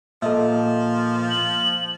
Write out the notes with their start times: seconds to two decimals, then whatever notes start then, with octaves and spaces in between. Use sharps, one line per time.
0.22 A#2 F3 A4 D#5 E5
1.30 F#7